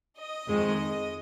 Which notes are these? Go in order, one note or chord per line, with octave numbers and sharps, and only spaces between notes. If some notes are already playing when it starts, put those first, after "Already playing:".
D#5
F2 D#3 G#3